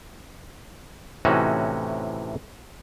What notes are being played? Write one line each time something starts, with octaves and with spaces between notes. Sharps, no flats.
A2 C3 E3 C#4 D#4 F#4